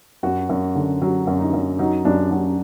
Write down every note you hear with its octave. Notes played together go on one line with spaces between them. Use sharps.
F#2 F#4
F#2
D3
F#3 F#4
F#2
D#4
F#2
F#3 D#4
F#2 D4
F#3 D4